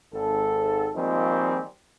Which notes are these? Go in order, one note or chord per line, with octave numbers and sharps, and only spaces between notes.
G#1 A4
A#2 D#3 F3 G3 G#3 C4